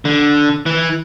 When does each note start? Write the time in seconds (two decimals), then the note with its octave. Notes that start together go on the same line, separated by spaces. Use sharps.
0.05 D3
0.66 E3